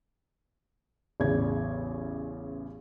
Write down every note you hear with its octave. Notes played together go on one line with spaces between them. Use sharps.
A1 E2 C#3 G#6